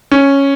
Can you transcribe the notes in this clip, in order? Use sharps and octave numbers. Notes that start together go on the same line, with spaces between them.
C#4